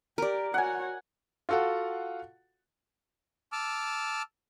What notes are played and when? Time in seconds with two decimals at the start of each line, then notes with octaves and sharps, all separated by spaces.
0.18 G4 A#4 D5
0.54 F#4 C#5 F#5 G#5
1.49 F4 F#4 A4 F5 F#5
3.52 A5 D6 E6 F6